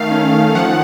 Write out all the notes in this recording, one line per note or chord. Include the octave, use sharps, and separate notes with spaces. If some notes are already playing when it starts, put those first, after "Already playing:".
Already playing: D#3 A3 F5
C#4
D#3
F3 F#5